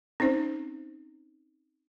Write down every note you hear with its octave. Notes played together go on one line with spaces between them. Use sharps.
C4 C#4 D#4 C5